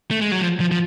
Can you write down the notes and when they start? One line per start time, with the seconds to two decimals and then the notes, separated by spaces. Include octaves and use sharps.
0.11 A3
0.21 G#3
0.32 F#3
0.42 F3
0.60 F3
0.71 F3